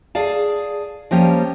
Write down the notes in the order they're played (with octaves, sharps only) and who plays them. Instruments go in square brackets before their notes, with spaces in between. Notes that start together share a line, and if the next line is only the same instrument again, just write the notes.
[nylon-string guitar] G#4 D5 F5 A5
F3 G3 A#3 C#4 G4